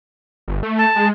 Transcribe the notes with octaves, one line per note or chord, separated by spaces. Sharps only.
G1
A3
A5
G#3